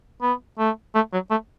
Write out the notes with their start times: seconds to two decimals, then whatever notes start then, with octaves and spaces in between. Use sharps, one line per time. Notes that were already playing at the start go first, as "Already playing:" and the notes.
0.22 B3
0.59 A3
0.95 A3
1.13 F#3
1.30 A3